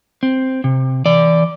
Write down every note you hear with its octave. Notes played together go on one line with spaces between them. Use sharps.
C4
C3
E3 D5